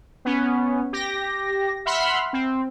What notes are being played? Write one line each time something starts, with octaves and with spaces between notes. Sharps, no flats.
B3 C#4
G4 A#6
E5 F#5 B5 C6 F6
C4